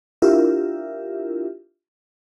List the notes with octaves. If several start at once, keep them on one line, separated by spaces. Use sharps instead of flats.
D4 E4 F4 G4 A#4 E5